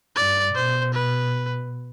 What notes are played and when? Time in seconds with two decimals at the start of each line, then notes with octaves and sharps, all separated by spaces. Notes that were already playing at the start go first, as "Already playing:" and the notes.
0.16 G2 D5
0.55 B2 C5
0.94 B4